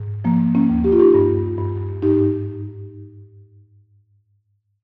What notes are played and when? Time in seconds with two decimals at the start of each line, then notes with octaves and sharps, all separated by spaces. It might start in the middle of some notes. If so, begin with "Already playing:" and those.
Already playing: G#2
0.24 F3 A#3
0.55 A#3 C#4
0.70 D#2
0.84 G4
0.92 F4
0.99 D#4 G4
1.14 G2
1.58 G2
2.02 G#2 D#4 G4